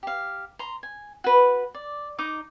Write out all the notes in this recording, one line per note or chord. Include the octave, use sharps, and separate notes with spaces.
G4 F5
A#5 C6
G#5
F#4 B4
D5
D#4 D#5 A#5 D6